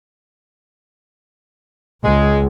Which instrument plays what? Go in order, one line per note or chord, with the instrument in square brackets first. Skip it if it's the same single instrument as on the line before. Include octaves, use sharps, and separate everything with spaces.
[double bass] C#2 [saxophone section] G#3